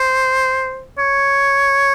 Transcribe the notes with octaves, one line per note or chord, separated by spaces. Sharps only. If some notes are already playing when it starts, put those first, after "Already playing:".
Already playing: C5
C#5